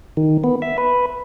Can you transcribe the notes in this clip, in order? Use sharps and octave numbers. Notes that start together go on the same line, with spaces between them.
D#3
B3
E5
B4